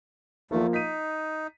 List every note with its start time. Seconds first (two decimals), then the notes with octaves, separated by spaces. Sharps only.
0.51 E2 F3 A3 A#3
0.73 D#4 B6 D#7